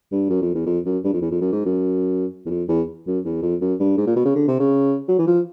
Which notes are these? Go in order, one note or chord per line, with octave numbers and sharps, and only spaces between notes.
G2
F#2
F2
E2
F2
F#2
G2
F2
E2
F2
F#2
G#2
F#2
E2
F2
E2
F#2
E2
F2
F#2
G2
G#2
A#2
B2
C#3
D3
C3
C#3
F#3
E3
F3